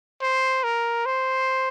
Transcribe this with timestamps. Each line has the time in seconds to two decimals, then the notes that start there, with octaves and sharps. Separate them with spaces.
0.22 C5
0.64 A#4
1.06 C5